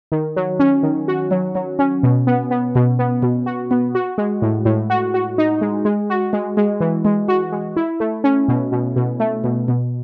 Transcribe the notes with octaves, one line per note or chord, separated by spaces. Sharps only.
D#3
F#3
C#4
D#3
F#4
F#3
F#3
C#4
B2
B3
B3
B2
B3
B2
F#4
B3
F#4
G#3
A2
A2
F#4
F#4
D#4
G#3
G#3
F#4
G#3
G#3
E3
G#3
F#4
G#3
E4
A3
C#4
B2
B2
B2
A3
B2
B2